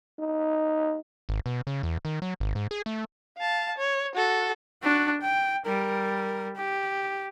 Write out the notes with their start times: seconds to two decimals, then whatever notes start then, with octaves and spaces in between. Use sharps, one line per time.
0.19 D#4
1.29 G#1
1.46 B2
1.67 C#3
1.83 E2
2.05 D#3
2.22 F#3
2.40 G#1
2.55 G#2
2.71 G#4
2.86 A3
3.38 F5 A5
3.78 C#5
4.15 F#4 A4
4.83 D4 F#4
5.22 G5
5.65 G3 A#4
6.56 G4